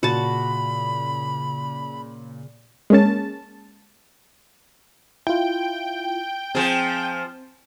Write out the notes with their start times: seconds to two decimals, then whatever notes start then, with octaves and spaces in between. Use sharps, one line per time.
0.03 A#2 C#3 F#4 A5 B5
2.90 G#3 A#3 C#4 A5
5.27 E4 F4 G5
6.55 F3 C4 G#4